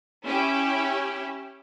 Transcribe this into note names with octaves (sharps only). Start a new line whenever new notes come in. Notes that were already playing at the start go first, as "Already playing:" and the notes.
C#4 E4 G4